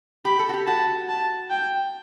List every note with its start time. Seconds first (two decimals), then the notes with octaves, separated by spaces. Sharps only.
0.25 G4 B5
0.39 A4
0.49 F#4
0.54 G4
0.66 F#4 A5
1.09 A5
1.50 G5